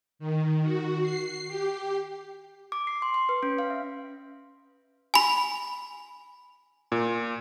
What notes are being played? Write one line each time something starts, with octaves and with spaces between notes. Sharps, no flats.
D#3
F#4
C7
G4
D6
C7
C6
C6
B4
C#4
F5
E5
G#5 B5
A#2